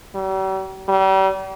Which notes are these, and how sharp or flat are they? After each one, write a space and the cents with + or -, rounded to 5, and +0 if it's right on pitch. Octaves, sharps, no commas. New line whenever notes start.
G3 -45
G3 -35